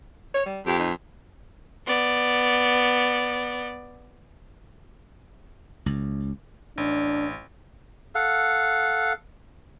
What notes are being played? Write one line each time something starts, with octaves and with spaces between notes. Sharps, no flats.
C#5
G3
F2 G4
D#4
B3 D5
C#2
A1 D4
A4 F5 F#5